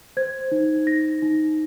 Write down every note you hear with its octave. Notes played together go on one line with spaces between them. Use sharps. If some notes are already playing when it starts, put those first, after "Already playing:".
C5 G#6
D#4
D#4 A#6
D#4